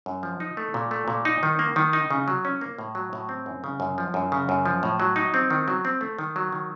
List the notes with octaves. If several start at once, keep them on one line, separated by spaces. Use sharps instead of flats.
F#2
F3
D#4
A3
A#2
A3
A#2
D#4
D#3
A#3
D#3
D#4
C#3
F#3
C#4
A#3
A2
F#3
A2
C4
F#2
C#3
F#2
F3
F#2
C#3
F#2
F3
A2
F#3
D#4
C4
D#3
F#3
C4
A3
D#3
F#3
D#3